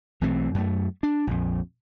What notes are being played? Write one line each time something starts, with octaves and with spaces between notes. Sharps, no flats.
B1 E3 A3 C4
F#2 A3
D4
A#1 F2